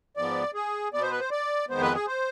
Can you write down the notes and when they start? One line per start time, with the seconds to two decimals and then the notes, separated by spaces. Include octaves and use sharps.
0.17 G#2 F3 B3 D5
0.54 G#4
0.93 B2 B3 D5
1.02 C5
1.11 B4
1.20 C5
1.31 D5
1.69 F2 D#3 G#3 B3 C5
1.81 B4
1.95 G#4
2.07 C5